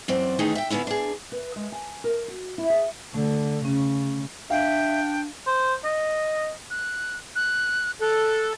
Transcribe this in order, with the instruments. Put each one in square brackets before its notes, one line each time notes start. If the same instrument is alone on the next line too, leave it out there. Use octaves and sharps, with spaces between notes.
[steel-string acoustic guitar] F#2 E3 C4 D5
D#3 E3 A3 C#4 D#4 G#4
E5 G5
D3 B3 C#4 D4 E4
D4 G#4
[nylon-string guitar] B4
G#3
G#5
A#4
F#4
E4
G#4
[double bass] D3 [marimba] A3
[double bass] C#3 [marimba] C#4
[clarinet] D4 [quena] E5 [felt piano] F5 [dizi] G5
[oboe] C5
D#5
[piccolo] F#6
F#6
[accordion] A4 [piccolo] F#6